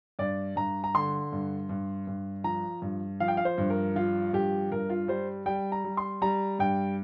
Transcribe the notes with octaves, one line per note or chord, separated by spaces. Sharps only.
G2 D5
G2 A#5
A#5
D3 C6
G2
G2
G2
F3 A#5
G2
F3 F5
G5
F5
C5
G2
A#4
F3 F4
G2 G4
G2 A#4
F4
G3 C5
G3 G5
A#5
G3
C6
G3 A#5
G2 G5